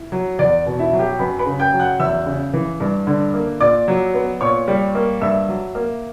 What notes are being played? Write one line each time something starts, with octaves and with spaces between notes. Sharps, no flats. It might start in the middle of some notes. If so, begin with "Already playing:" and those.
Already playing: E4
F#3
E2 D5
B2
E4 E5
F#3
G4 G5
F#2 B4 B5
B4 B5
C#3
G5 G6
F#3
F#5 F#6
E2 E5 E6
C#3
E3
G2
D3
A#3
A#2 D5 D6
F#3
B3
A#2 C#5 C#6
G3
A#3
G2 E5 E6
F#3
A#3